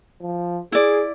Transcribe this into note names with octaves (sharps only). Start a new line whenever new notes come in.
F3
E4 G#4 D5